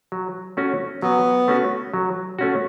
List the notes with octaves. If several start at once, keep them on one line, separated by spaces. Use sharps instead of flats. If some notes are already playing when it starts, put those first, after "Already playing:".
F#3
A3 C#4 F#4
F#3 B3
A3 C#4 F#4
F#3
A3 C#4 F#4